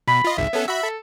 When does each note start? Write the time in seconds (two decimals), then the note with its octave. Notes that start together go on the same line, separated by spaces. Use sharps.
0.07 B2 B5
0.24 F4 D#5
0.38 G#1 C#2 E5
0.53 B3 C#4 A4
0.68 F#4 E5 B5
0.83 A4